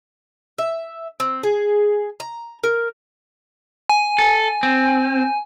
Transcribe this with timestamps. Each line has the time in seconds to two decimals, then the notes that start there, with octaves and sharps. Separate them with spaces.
0.58 E5
1.20 C4
1.43 G#4
2.20 A#5
2.64 A#4
3.89 G#5
4.18 A4
4.63 C4